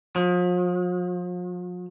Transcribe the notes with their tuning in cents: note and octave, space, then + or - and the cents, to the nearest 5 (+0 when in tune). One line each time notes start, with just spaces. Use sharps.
F3 +40